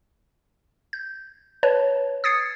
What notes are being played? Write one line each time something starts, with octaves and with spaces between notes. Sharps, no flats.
G6
B4 C#5 A5
D#6 G#6 A6 C7 C#7